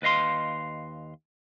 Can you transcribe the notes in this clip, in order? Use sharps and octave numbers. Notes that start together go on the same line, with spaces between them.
D#2 B4 D#5 F5 C6